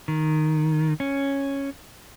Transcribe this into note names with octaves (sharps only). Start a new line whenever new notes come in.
D#3
C#4